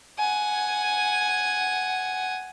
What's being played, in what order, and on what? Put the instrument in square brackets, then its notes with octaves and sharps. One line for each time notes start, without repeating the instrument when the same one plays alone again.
[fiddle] F#5 G#5